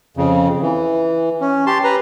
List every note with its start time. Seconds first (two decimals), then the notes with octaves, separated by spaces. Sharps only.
0.17 F2 C#3
0.62 E3
1.41 C#4
1.67 G4 A5 C6
1.84 B4 A#5